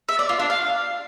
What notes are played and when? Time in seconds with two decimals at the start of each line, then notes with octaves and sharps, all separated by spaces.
0.09 E5
0.19 D5
0.29 F4
0.40 D4
0.50 F5